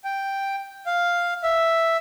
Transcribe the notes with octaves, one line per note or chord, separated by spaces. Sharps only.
G5
F5
E5